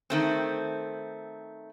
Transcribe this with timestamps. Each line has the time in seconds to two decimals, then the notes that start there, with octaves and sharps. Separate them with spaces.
0.10 D#3 A3 C4